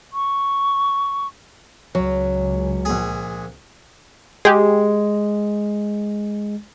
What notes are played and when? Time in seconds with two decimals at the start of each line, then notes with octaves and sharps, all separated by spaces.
0.13 C#6
1.95 C#2 F#3 C#4
2.85 A#1 G#4
4.45 G#3 G4 G#4